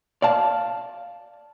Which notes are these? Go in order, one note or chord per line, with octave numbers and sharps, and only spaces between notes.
D5 F5 A5